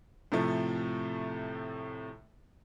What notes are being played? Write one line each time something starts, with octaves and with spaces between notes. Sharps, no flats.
A2 C3 F3 A3